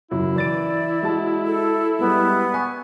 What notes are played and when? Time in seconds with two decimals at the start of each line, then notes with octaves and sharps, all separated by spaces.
0.11 F#1 F#3 E4
0.36 E3 D5 A6 D7
1.02 G#3 F#4 A5
1.46 A4
1.99 G3 G#3 B3
2.54 G#5 C#6